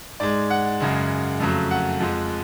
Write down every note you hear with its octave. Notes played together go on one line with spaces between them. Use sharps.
G#2 G#3 D5
F#5
F#2 C#3 G#3
F2 C#3 F#3 A3
F#5
F2 F3 G#3